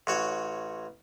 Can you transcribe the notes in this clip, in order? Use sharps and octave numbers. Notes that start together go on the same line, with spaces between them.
A1 F#4 C#5